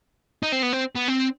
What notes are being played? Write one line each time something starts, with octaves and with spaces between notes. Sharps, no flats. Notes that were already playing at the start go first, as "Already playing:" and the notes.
D#4
C4
B3
C4
B3
C4